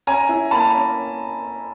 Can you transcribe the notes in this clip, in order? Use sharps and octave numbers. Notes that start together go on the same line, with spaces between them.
C#4 G#5 A#5
E4
A#3 A5 B5
C#4